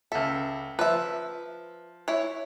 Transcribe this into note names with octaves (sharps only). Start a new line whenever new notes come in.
C#2 A4 E5
F3 B4 E5
E4 C#5